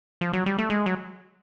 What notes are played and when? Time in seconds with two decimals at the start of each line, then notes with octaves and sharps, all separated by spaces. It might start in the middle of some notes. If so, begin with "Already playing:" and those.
0.21 F3
0.33 F#3
0.46 G3
0.58 A3
0.70 G#3
0.86 F#3